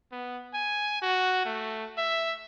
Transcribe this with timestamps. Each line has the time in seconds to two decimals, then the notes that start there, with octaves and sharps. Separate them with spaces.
0.12 B3
0.54 G#5
1.02 F#4
1.45 A3
1.98 E5